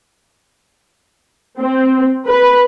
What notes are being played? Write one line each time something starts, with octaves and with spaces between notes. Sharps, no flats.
C4
B4